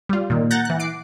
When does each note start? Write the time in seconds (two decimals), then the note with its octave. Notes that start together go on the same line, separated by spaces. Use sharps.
0.09 G3 F4
0.30 A#2 D#3
0.51 F#5 A#5 F#6 G6 A6 A#6
0.65 E3 F#6
0.79 D6 C7 D7